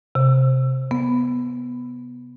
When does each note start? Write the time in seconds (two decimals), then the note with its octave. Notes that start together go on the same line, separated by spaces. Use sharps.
0.15 C3
0.91 B3